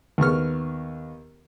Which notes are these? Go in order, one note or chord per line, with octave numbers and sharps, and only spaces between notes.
D#2 B3 C#6 F6